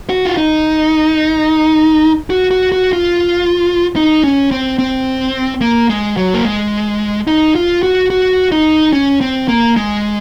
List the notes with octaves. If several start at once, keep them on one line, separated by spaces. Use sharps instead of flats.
F#4
F4
D#4
F#4
F#4
F#4
F4
D#4
C#4
C4
C4
A#3
G#3
F#3
A#3
G#3
D#4
F4
F#4
F#4
D#4
C#4
C4
A#3
G#3